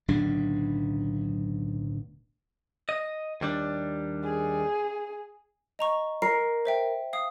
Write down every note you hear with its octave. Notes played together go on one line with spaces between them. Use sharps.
D1 B1 C#3 D4
D#5
D#2 G3 D4
G#4
D#5 A#5 C#6
A#4 C7
C5 E5 G5
F5 D#6